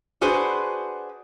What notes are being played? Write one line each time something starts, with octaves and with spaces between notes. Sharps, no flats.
D4 F#4 G#4 B4 C5